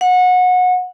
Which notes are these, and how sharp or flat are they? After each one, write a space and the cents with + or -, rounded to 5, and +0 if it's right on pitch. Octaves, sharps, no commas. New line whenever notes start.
F#5 -25